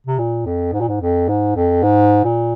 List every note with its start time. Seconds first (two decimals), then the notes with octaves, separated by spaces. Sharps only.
0.07 C3
0.18 A#2
0.46 F2
0.73 G#2
0.80 A#2
0.88 G#2
1.01 F2
1.28 G#2
1.56 F2
1.83 G#2
2.24 A#2